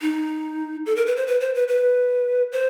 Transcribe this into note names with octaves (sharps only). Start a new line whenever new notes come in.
D#4
A4
A#4
B4
C5
B4
C5
B4
B4
C5